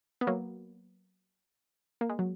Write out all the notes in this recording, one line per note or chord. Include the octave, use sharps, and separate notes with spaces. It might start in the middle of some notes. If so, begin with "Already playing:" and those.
B3
F#3 A#3
A#3
G#3
F#3